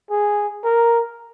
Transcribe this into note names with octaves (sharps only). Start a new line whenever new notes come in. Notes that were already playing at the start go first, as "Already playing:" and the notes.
G#4
A#4